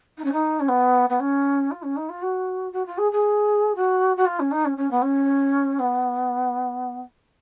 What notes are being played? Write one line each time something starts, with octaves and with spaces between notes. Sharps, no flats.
D#4
C#4
D#4
C#4
B3
B3
C#4
F4
C#4
D#4
F4
F#4
F#4
F4
G#4
G#4
F#4
F#4
F4
C#4
D#4
C#4
C#4
B3
C#4
B3